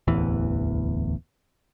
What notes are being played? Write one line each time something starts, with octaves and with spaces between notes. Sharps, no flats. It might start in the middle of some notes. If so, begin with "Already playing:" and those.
D1 A1 E2 E3